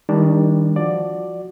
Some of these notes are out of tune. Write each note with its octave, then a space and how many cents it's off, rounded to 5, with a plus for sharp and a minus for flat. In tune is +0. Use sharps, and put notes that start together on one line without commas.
D#3 +25 G3 +25 D4 +0
F3 +0 F#4 +0 D5 +10